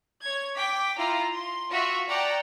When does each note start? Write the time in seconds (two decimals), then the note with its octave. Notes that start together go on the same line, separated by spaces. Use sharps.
0.22 C#5 G#6
0.56 G5 D6 B6
0.98 E4 F4 A#5
1.33 C6
1.70 F4 F#4 E5
2.09 D5 F#5 G5 A5 A#5